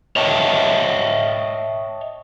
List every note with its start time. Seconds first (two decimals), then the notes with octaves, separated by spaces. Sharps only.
0.16 C#5 D#5 E5 G5 A5